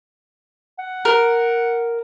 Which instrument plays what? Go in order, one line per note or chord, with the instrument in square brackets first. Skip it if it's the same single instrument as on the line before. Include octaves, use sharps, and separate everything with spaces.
[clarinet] F#5
[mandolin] A#4